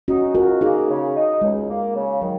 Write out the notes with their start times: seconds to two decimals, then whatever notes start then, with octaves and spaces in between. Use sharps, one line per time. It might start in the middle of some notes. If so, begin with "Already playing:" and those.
0.08 C#4 D#4 F#4
0.34 C#2 F#4 A#4
0.61 A#3 D#4 G#4
0.89 C#3
1.15 D#4
1.42 C#2 G#3
1.69 A#3
1.96 C#3
2.22 D#3 F#3